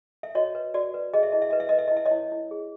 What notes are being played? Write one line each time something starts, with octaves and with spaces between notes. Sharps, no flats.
E5
F#4 C#5 D#5
B4
F#4 D5
B4
G#4 D#5
E5
E4 D#5
E5
B4 D#5
E5
B4 D#5
E5
E4 D#5
E5
C#5 D#5
E4
E4
G#4